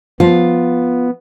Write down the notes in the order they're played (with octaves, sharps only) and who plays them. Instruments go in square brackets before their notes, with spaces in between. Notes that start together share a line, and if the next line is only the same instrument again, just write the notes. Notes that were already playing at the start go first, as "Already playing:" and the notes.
[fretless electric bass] F3 [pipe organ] B3 [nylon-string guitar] F4